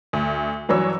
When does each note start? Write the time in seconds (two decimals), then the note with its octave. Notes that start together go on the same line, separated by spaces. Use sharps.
0.13 D2
0.69 G2 E3 F#3 D4 C#5 E6